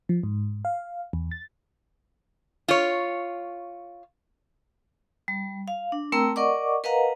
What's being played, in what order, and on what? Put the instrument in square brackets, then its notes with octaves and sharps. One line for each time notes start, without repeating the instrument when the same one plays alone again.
[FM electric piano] F3
G#2
F5
E2
A6
[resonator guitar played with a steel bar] F4 C#5
[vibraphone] G3
F5
D4
A3 C4 A#4 G5 A#5 E6
A#4 D5 D#5 F#5 C#6 D6
A#4 B4 D#5 F5 F#5 A#5